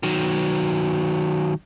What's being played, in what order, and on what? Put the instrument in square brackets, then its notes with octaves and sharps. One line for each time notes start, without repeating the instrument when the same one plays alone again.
[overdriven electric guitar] D#3 F#3